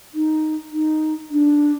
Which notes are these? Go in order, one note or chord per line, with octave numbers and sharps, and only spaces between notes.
D#4
D#4
D4